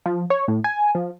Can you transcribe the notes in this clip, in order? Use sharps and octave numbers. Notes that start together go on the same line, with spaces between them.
F3
C#5
A2
G#5
F3